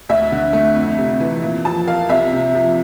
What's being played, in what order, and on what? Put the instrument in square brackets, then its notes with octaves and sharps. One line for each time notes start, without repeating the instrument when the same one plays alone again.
[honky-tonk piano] D2 E5
D3
A3
F2
C3
E3
A#2
F3 A5
A#3 F5
C2 E5
C3
F3